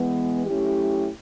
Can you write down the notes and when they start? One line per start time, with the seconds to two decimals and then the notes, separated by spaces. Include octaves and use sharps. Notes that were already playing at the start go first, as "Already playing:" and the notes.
Already playing: E3 G#3 B3
0.47 F#3 A3 C#4 E4 G4